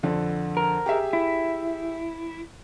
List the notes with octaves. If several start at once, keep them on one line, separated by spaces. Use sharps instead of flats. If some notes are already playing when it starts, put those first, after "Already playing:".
F2 D3 A4
A#4
G4 G#4 E5
E4